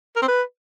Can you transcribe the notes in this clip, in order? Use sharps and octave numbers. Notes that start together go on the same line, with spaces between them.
A#4
C4
B4